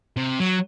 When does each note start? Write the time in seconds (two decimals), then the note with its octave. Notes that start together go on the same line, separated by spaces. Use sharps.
0.17 C3
0.40 F#3